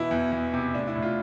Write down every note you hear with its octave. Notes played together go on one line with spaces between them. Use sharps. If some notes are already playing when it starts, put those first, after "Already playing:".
Already playing: B2 E3 E4
E2
E2
C3
A2 D4
E4
A2
F4